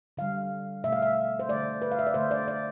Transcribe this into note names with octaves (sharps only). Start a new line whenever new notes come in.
D3 G3 F5
B2 A3 E5
F5
E5
C5
D3 A3 D5
B4
F5
E5
D5
D3 A3 C5
D5
D5